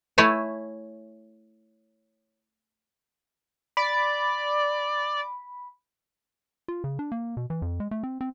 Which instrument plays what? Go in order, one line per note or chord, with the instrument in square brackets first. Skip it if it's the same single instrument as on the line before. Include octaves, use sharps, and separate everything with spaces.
[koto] A3 E4 C#5 G#5 A5
[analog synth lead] D5 [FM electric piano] B5
[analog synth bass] F4
C#3
D4
A#3
B2
E3
F2
G#3
A3
C4
C4